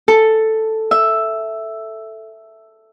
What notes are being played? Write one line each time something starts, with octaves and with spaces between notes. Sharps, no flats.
A4
E5